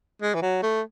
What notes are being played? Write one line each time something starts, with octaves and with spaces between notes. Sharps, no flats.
G#3
E3
F#3
A3